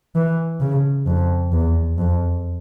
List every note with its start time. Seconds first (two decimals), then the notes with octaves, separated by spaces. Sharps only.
0.15 E3
0.61 C#3
1.07 F2
1.52 E2
1.98 F2